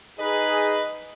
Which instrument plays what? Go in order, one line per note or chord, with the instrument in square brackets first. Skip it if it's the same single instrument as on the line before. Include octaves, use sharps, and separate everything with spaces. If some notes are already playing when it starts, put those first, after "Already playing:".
[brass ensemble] D#4 G#4 B4 [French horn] D#5